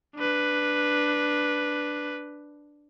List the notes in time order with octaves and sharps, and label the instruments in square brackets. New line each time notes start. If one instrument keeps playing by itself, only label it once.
[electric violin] D4 B4